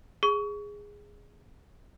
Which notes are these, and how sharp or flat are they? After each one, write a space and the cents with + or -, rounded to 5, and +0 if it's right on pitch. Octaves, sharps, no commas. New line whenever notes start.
G#4 -10 C#6 +25